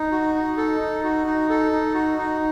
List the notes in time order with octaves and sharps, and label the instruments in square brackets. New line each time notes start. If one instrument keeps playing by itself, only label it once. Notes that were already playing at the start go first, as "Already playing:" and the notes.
Already playing: [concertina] D#4
F#4
D#4
A4
D#4
F#4
D#4
A4
D#4
F#4
D#4